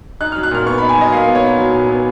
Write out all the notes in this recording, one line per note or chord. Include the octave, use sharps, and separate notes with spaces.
D#4 F#6
F#3 F6
F#6
A#2 F6
B3 C#6
D#4 B5
G#5
F#3 D#5
A#2 F5
B3
C#5
D#4
F#3
A#2
B3